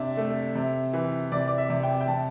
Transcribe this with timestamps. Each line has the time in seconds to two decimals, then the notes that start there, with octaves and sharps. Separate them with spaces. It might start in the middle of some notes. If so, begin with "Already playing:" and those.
Already playing: C3 D4 D5 E5
0.17 A3
0.55 C3
0.93 E3
1.32 C3 D5
1.47 D5
1.58 E5
1.70 C3
1.83 G5
2.01 G5
2.08 C3 A5